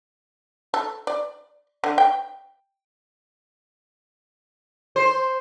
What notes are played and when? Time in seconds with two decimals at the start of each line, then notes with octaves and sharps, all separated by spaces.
0.74 A4
1.07 D5
1.84 D3
1.98 G5
4.96 C5